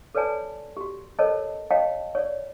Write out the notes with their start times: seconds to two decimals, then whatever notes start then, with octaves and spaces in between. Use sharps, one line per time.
0.15 A4 B4 C#5 D5 G#5 A5
0.77 F#4 G4
1.19 A4 A#4 C5 C#5 D#5 A5
1.71 C#5 D#5 F5 G5 A5
2.15 C#5 D5